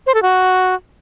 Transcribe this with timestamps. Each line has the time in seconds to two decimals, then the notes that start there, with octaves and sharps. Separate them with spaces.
0.07 C5
0.15 A4
0.22 F#4